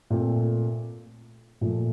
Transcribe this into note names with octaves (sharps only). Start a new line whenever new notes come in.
A#2 A3 C4
A#2 F3 A3